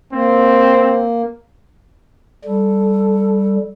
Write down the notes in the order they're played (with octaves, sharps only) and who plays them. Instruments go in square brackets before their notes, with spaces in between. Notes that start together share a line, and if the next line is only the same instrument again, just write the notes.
[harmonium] A#3 [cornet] C4
[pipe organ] G3 [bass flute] A4